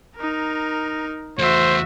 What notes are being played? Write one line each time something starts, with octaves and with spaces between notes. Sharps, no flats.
D#4 A#4
E2 A3 F#4 C5 E5